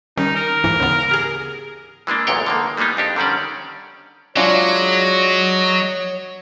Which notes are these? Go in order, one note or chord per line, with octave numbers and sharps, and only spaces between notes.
D#3 G3 C#4 D#4
A#4
D2 G#2 E3
C#3 B3
G4 G#4
E3 G#3 A#3 D4
B1 E2 A#2 C#5 G5
D3 D#3 A#3
G3 G#3 A#3 B3 D#4
F2 D4 G4
D3 D#3 G3 C#4 D5
F#3 G#3 D4 F4 F#4 C#5 D#5 F#5